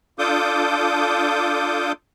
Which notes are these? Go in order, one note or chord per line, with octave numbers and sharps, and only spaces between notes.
D4 F4 A4 D6 D#6 G6